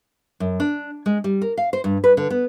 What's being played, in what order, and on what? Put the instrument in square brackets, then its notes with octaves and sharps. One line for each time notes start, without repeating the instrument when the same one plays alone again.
[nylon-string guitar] F#2
D4
G#3
G3
A#4
F5
C5
G2
B4
D3
B3